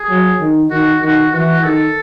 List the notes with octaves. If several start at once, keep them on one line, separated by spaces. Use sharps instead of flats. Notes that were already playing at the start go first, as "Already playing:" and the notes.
Already playing: G#4
F#3
D#3
D#3 F#4
D#3 F#4
E3 F#4
D#3 A4